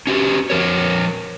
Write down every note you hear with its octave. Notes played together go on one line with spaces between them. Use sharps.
C#4 F#4 G4
F3 A#4 C#5